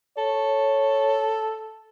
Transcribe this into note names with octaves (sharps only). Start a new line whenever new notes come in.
A4 C#5